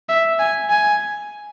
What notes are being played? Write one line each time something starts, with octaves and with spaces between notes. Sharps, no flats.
E5
G#5
G#5